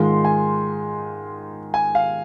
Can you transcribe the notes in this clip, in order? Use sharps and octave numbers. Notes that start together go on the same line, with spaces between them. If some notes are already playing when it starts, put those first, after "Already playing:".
Already playing: G#2 D#3 G#3 F4 C6
G#5
G#5
F5